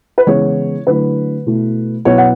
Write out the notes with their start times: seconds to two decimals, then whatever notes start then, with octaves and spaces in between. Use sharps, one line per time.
0.18 B4
0.27 C#3 E3 G#3 B3 E4 C#5
0.87 D3 F#3 A3 E4 B4
1.46 B2 A3 E4
2.05 B2 F#3 B3 E4 C#5
2.18 F#5